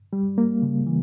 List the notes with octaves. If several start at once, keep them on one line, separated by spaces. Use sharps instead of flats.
G3
A#3
C#3
E3